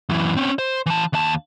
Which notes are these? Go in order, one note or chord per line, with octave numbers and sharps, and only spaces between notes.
F#2 E3
C4 C#4
C5
E3 A5
D#2 A5